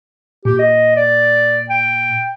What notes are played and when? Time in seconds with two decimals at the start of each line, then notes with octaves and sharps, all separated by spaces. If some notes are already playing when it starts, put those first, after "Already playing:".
0.45 A#2 G4
0.59 D#5
0.96 D5
1.69 G5